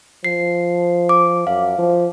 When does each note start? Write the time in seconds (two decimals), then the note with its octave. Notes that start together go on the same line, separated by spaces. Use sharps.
0.24 F3 C7
1.09 D6
1.47 F#2 F5
1.78 F3